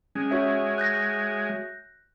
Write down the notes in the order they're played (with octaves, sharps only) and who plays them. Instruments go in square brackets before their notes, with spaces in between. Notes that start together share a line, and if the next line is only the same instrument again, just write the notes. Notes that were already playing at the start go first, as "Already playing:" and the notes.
[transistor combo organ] G#3 [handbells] C#4
[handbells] F#4 C#5 E5
[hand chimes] F#6 G6 A#6